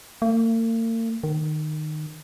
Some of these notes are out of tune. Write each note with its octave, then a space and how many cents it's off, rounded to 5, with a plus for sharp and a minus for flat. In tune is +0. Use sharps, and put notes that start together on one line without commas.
A#3 -45
D#3 -20